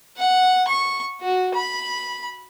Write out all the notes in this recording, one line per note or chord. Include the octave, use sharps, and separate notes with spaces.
F#5
C#6
F#4
B5